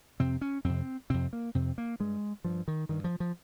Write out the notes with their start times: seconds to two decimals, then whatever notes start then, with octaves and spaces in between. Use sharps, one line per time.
0.20 F2 C3 C4
0.41 C#4
0.64 F2 C3 C4
1.10 F2 C3 C4
1.33 A#3
1.55 F2 C3 C4
1.78 A#3
2.00 G2 G#3
2.44 G2 F3
2.68 D#3
2.89 G2 D#3
3.04 F3
3.20 F3